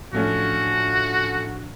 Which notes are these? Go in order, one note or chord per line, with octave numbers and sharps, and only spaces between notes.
A2 F3 A3 C#4 D4 F#4